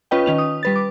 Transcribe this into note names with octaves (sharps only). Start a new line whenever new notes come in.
C#4 F4 B4 D#5 G5
D#3 C#4 F7
D#6
G3 B4 A6
D6